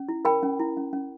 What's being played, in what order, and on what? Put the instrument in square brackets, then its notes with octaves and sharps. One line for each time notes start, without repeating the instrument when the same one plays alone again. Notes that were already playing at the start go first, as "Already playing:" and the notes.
Already playing: [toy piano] C#4
E4
A#4 G5 B5
C#4
E4
C#4
C#4